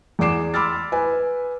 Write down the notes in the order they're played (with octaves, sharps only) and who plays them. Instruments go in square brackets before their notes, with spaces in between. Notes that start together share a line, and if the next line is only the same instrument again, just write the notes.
[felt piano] E2 G#4 D5 D6 C7 E7
B5 C6 D6 E6 F6 A6
B4 G#5